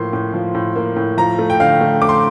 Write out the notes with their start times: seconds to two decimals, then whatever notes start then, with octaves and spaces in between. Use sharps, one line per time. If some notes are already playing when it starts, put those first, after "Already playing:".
Already playing: A2 F3 A#3 C6
0.13 A2
0.34 F3
0.55 A2
0.76 A#3
0.96 A2
1.17 F3 A#5
1.39 A3
1.50 G5
1.60 D3 F5
1.81 A3
2.02 A3 D6
2.09 C6